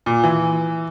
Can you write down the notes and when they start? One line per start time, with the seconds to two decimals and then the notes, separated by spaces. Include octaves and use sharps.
0.06 A#2
0.24 E3